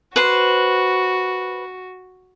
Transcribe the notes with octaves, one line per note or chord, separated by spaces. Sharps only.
F#4 B4 C5